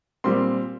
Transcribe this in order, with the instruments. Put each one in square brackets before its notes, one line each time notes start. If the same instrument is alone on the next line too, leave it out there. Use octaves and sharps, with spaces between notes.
[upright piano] A#2 G3 C4 C6